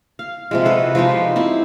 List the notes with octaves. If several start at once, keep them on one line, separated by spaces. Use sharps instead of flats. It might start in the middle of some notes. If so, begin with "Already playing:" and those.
F5
C3 F3 G#3
F#4 A4 B4
F3 G#3 D#4 G4
C4 E4 C5